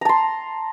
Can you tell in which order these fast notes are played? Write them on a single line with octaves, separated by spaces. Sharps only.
A#5 A5 C6